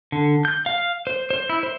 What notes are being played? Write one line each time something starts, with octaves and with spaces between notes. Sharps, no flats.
D3
G6
F5
C5
C5
E4
C5